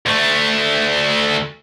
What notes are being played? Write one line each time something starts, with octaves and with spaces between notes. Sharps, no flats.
D2 A3